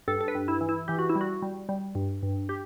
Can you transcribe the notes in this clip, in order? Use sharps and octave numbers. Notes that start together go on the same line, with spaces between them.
G2 A4
A4
B4
G2
E4
E3
E4
E3 G4
F#4
E4
G3
F#4
G3
G3
G2
G2
G4